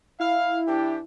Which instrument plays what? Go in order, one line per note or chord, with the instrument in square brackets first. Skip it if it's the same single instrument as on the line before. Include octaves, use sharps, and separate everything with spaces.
[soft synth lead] E4 [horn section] F5
[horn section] E3 D4 G4